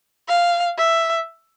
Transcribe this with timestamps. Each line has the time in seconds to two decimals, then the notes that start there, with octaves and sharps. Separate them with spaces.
0.28 F5
0.78 E5